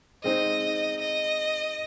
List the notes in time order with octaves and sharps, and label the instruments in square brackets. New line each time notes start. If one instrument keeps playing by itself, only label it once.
[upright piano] G#3 C4 D#4 [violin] D#5
[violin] D#5